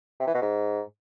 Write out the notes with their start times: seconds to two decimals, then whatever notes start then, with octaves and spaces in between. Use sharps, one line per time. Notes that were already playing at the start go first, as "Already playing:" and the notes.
0.20 C3
0.27 E3
0.34 B2
0.42 G#2